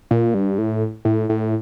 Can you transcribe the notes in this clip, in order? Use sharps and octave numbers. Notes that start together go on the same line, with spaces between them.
A#2
G2
A2
A2
A2